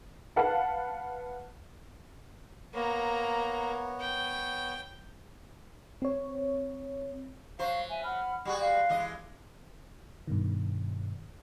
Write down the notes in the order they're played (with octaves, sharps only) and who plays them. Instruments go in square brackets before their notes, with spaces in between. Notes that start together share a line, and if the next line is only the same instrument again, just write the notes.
[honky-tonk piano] B4 F5 F#5 A5
[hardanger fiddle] A#3 A#5 [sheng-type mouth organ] B3 C#5
[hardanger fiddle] G5
[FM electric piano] C4 C#5
[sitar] F#3 C5 [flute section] F5 C#6
[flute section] E5 G#5
F#5 B5 F6
[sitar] G3 F#4 G#4 [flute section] F#5 B5 C#6
[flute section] F5 C6
[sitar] E3 G#3 D#5
[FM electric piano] G2 B2 D#3